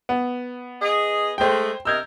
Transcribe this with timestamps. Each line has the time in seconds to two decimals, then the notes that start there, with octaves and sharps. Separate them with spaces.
0.09 B3
0.81 G#4 D#5
1.38 G#3 A3 C5 G5
1.85 C3 A#4 D#5 E6 G6 G#6